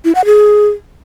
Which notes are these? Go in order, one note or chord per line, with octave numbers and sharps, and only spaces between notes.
E4
F#5
G#4